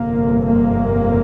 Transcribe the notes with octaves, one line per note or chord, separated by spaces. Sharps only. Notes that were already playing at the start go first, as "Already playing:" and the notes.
Already playing: G1 F2 C3 A#3
A#3